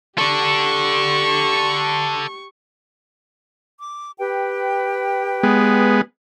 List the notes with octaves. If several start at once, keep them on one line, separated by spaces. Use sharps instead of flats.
G4 A4 D5 C#6
D6
G4 B4 G5
G#3 B3